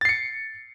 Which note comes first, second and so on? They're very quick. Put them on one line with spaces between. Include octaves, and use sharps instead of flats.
A6 C7 C#7